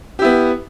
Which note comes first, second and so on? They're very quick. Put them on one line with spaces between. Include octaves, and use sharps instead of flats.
G4 E4 B3